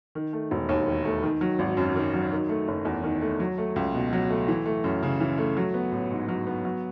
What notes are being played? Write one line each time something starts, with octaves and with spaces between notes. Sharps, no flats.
D#3
A3
E1
D#2
D#3
A3
D#3
F#3
G#1
F#2
D#3
F#3
D#3
A3
F#1
E2
D#3
A3
F#3
A3
C#2
B2
F#3
A3
E3
A3
F#2
C#3
E3
A3
F#3
B3
A1
G#2
F#3
B3
F#3